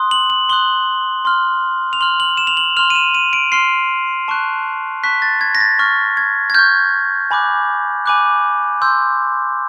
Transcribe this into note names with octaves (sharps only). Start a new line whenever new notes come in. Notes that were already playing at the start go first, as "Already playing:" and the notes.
Already playing: C6 D#6 F#6
F#7
F#7
C6 D#6 F#6 G7
C6 F6
F7
C6 F6 F#7
F#7
E7
F7
F#7
C6 F6 F7
D#7
E7
D#7
D7
C6 F6 C7
A5 C#6 F#6
A5 C#6 F#6 B6
A6
G#6
A#6
A6
C#6 F6
G#6
G#6
C#6 F6 G6
G#5 B5 D6 F#6
G#5 B5 D6 F#6
C6 E6 G6